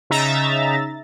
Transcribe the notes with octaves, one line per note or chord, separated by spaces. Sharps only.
C#3 D#4 E5 A#5 A6